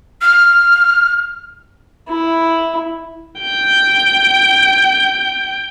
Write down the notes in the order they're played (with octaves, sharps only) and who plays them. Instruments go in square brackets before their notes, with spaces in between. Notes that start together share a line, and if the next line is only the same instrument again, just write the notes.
[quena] F6
[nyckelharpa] E4
[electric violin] G5 G6